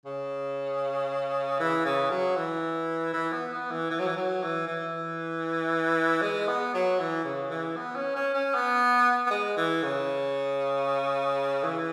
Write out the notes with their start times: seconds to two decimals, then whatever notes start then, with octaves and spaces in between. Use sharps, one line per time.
0.06 C#3
1.60 E3
1.85 C#3
2.11 F#3
2.37 E3
3.14 E3
3.33 B3
3.53 B3
3.71 E3
3.91 E3
3.99 F#3
4.07 E3
4.17 F#3
4.43 E3
4.68 E3
6.22 G#3
6.48 B3
6.74 F#3
6.99 E3
7.25 C#3
7.51 E3
7.76 B3
7.96 C#4
8.16 C#4
8.34 C#4
8.55 B3
9.27 B3
9.31 G#3
9.57 E3
9.83 C#3
11.63 E3